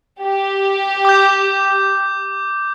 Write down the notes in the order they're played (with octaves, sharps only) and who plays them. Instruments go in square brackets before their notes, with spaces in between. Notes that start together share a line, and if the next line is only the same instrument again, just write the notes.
[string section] G4
[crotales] D6 G6